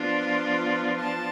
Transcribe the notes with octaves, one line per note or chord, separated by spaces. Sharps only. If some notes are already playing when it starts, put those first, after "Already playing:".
Already playing: F3 B3 D4 F4
A5